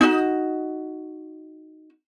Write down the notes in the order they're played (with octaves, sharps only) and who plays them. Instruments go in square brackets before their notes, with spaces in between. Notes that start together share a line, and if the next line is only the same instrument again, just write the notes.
[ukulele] D#4 F#4